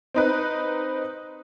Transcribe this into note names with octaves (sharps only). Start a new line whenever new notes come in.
C4 D#4 B4